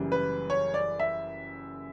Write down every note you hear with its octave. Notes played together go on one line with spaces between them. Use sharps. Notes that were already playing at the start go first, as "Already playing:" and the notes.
Already playing: F#1 F#2 E3 G3
B4
C#5
D5
E5